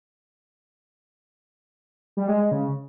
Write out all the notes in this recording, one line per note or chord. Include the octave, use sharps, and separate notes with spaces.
G3
G#3
G#3
C#3